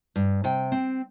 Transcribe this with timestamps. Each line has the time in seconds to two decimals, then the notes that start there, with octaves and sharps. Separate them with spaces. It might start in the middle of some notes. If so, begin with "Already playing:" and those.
0.16 G2
0.44 C3 G5
0.72 C4